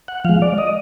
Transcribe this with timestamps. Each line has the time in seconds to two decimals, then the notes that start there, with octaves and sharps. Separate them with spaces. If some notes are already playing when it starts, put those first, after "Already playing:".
0.08 F#5
0.24 F3 G#3 F5
0.42 D5
0.58 D#5